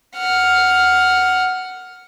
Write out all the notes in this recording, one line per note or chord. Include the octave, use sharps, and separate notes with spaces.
F#5 F6